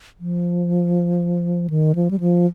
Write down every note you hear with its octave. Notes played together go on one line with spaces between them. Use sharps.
F3
D#3
F3
G3
F3